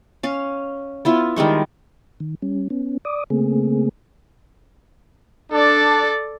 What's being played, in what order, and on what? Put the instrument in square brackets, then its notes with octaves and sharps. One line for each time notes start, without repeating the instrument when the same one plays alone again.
[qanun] C#4 F5
B3 E4 F4
D#3 G3 G#3 C#6
[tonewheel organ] D#3
G3 C#4
B3 C#4
D5 D6 D#6
C#3 A3 A#3 C4 G#4
[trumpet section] D4 [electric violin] A4 D5